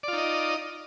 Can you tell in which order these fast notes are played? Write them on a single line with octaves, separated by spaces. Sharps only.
D5 F4 D#4 D#5